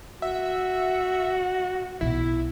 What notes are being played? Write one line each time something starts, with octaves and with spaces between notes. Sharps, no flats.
F#4 E5
B1 B2 E4 E5